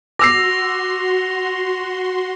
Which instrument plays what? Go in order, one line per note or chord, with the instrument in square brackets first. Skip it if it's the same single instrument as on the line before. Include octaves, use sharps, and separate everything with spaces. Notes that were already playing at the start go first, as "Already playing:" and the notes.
[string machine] F#4 C6 [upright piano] D6 E6 C7 [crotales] A#6 F7